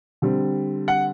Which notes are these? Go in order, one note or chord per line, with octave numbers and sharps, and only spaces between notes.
D3 G3 C4
F#5